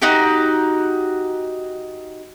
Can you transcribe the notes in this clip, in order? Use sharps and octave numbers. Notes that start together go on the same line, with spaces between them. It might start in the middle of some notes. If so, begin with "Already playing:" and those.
D#4 F#4 G4